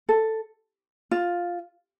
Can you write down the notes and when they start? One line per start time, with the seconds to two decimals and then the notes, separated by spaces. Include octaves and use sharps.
0.09 A4
1.11 F4